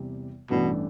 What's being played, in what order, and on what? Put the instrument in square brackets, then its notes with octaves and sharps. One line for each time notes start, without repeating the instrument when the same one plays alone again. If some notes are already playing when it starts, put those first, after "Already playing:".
Already playing: [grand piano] E2 C3 G3
[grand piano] A1 G2 E3 A3 D4 [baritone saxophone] B2